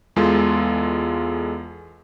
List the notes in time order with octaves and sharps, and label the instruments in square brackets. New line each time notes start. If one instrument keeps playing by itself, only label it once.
[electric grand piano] E2 G#3 F4 A4